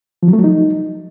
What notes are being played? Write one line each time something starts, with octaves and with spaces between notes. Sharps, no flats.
F3
F#3
A3
F#3
D#4